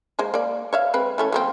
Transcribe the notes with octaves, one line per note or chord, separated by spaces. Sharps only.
G#3 A#3 C5
A#3 D5
C#5 E5 F5
G#3 C4 B4
E3 A3 C#4
F#3 A#3 C4